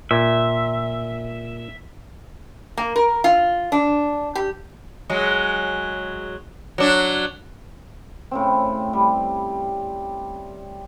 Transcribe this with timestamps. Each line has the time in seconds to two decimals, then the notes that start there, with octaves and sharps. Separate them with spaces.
0.11 A#2 E5
2.77 A#3
2.96 A#4
3.24 F4
3.72 D4
4.35 G4
5.10 F#3 G#3
6.78 F#3 D4
8.31 A2 C#3 C4
8.93 G3